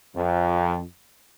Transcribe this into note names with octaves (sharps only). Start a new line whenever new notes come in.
F2